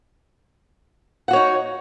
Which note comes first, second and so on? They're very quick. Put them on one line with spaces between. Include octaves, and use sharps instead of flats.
F#5 F#4 C#5 D#4